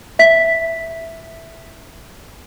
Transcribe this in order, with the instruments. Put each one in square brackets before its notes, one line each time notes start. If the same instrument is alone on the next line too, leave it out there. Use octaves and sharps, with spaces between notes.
[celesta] E5 B6